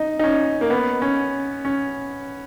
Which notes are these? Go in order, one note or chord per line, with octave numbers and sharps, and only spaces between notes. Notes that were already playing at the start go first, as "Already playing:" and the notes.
Already playing: D#4
D#4
C#4
A#3
B3
C#4
C#4